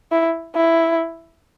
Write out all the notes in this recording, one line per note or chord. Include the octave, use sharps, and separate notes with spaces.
E4
E4